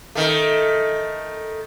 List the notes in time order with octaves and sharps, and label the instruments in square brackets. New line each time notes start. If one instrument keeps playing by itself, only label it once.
[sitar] D#3 A3